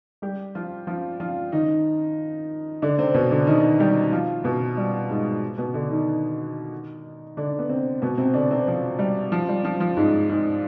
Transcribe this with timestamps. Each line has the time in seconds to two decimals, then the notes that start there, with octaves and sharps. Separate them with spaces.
0.22 G3 G4
0.55 F3 F4
0.87 F3 F4
1.20 F3 F4
1.52 D#3 D#4
2.82 D3 D4
2.98 C3 C4
3.15 B2 B3
3.31 D3 D4
3.47 D#3 D#4
3.80 G3 G4
4.12 F3 F4
4.44 B2 B3
4.77 G3
5.09 G#2 G#3
5.58 B2 B3
5.74 D3 D4
5.90 D#3 D#4
7.37 D3 D4
7.59 B3
7.69 C3 C4
8.02 B2 B3
8.18 C3 C4
8.34 D3 D4
8.51 C3 C4
8.67 F3
8.99 G3
9.32 F3
9.49 G3
9.65 F3
9.80 F3
9.97 G#2 G#3
10.29 G#2 G#3